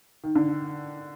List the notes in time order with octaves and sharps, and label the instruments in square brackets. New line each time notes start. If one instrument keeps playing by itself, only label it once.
[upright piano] D#3
D3